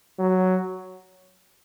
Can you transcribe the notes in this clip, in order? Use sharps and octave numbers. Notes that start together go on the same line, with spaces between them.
F#3